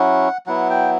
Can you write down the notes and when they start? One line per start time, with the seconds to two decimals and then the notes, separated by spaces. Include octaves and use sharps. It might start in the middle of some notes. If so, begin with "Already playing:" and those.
Already playing: F#3 C#4 E4 F#5
0.47 F#3 B3 E4 F#5
0.70 G5